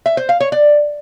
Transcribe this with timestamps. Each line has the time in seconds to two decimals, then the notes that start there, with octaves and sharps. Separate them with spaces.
0.06 E5
0.17 C5
0.29 F5
0.40 C#5
0.52 D5